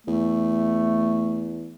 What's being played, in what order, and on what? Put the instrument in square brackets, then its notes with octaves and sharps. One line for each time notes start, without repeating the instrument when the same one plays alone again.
[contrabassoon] E2 [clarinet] A3